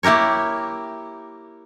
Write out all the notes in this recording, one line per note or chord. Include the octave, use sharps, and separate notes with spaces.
A#3 E4 G4 A#4 C#5